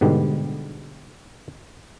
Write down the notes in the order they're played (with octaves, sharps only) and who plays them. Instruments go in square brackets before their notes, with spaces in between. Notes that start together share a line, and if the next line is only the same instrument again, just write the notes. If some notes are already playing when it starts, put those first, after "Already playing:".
[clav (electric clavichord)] G#2 B2 D3 G3